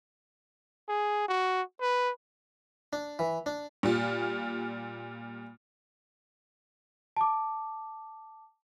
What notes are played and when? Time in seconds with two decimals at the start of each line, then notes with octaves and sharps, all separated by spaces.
0.89 G#4
1.28 F#4
1.81 B4
2.93 D4
3.19 E3
3.46 D4
3.83 A#2 G3 F4
7.17 A5 D6